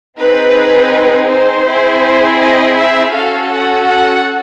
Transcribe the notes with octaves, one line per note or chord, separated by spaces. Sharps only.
C4 D#4 G#4 B4
C5
C4 E4 G#4
D#5
E5
C#4 F#4 A4 F5
F#5
F#5